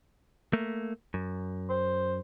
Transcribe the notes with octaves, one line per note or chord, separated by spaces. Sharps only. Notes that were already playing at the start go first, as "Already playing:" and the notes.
A3 A#3
F#2
C5